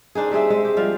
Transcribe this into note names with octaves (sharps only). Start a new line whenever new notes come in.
C4 D4 D#4 G#4
G3 C4 G#4 E5
G#3
G4
F3 G3 F5